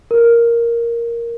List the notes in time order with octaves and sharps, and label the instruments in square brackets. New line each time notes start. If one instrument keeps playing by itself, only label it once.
[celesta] A#4